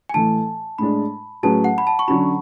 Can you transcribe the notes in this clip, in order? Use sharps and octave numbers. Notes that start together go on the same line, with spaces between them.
G#5
A2 E3 A3 A5
A2 G#3 D4 B5
A2 F#3 C#4 G#4 B4 A5
F#5
B5
A5
C#6
D3 F#3 C#4 F#4 B5